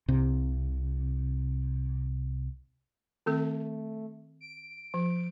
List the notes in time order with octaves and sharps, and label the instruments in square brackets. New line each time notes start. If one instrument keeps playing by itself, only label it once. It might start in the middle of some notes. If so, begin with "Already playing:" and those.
[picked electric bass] C2 [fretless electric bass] C3
[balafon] D#3 C4 A4 [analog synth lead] A3
[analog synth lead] D7
[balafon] F3